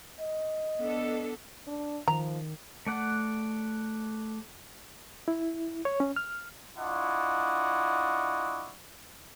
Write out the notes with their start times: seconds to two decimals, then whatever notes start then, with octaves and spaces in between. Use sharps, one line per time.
0.20 D#5
0.78 B3 D4 A4
1.67 D4
2.08 D#3 F3 A#5
2.87 A3 D5 F#5
5.28 E4
5.85 C#5
6.00 C#4
6.16 F6
6.78 D4 E4 F4 D#5 F#5 C#6